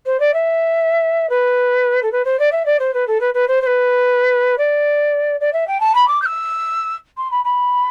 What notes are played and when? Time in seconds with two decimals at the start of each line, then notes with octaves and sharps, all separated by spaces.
0.06 C5
0.20 D5
0.33 E5
1.29 B4
2.02 A4
2.12 B4
2.25 C5
2.39 D5
2.52 E5
2.65 D5
2.79 C5
2.94 B4
3.07 A4
3.20 B4
3.34 B4
3.48 C5
3.62 C5
3.66 B4
4.58 D5
5.40 D5
5.53 E5
5.67 G5
5.80 A5
5.94 B5
6.08 D6
6.22 G6
6.25 E6
7.17 C6
7.31 B5
7.44 B5